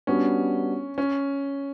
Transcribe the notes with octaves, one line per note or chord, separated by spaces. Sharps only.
G3 B3 C#4 D4 F#4
C#4